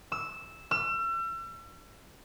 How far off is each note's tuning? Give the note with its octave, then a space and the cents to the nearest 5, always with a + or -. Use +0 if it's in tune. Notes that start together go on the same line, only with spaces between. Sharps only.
E6 -5
E6 +40